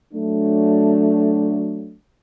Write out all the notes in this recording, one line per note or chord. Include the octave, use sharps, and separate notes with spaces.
F#3 A3 D4